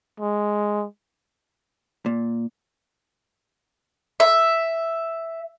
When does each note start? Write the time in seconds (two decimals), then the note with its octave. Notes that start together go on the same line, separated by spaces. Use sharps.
0.20 G#3
2.06 A#2
4.20 E5